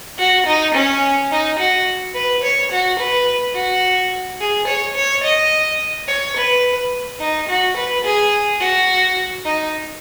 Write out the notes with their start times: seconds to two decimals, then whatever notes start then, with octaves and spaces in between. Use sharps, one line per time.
0.19 F#4
0.46 D#4
0.75 C#4
1.31 D#4
1.59 F#4
2.15 B4
2.43 C#5
2.71 F#4
2.99 B4
3.55 F#4
4.40 G#4
4.67 C#5
4.96 C#5
5.23 D#5
6.08 C#5
6.37 B4
7.20 D#4
7.48 F#4
7.77 B4
8.04 G#4
8.60 F#4
9.45 D#4